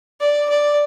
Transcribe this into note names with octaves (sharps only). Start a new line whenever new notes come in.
D5
D5